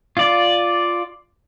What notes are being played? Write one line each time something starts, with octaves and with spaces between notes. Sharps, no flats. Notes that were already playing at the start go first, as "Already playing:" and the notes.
F4 D5